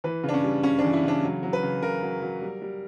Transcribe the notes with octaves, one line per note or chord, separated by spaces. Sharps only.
E3 B4
C#3
D4
C#4
G3
C#3 C#4
E3 D4
E4
C#3
D4
F#3
F#3
B4
C#3
C#3 A#4
F#3
F#3
G3
G3